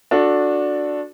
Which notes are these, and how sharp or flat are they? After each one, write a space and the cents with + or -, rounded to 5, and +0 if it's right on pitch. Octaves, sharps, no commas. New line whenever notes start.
D4 +0 F#4 -25 A4 +0